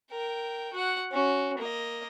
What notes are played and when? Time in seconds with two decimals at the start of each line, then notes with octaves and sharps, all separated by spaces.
0.11 A#4 G5
0.73 F#4 F#5
1.11 C#4 F#4
1.58 A#3 D#5